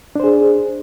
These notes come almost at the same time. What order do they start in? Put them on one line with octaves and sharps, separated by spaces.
D4 C5 G#4